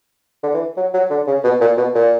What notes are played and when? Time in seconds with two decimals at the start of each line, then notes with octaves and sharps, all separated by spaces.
0.43 D3
0.54 E3
0.77 F#3
0.94 F#3
1.11 D3
1.27 C#3
1.44 B2
1.61 A#2
1.78 B2
1.95 A#2